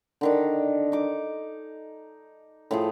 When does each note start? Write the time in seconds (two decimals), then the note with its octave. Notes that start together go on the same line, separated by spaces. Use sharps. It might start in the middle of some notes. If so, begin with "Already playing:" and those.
0.21 D3 D#3 D4
0.92 D#4 D6
2.71 A2 F3 G#4